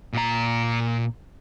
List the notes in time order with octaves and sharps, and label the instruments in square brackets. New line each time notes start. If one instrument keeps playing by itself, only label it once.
[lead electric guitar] A#2 A#5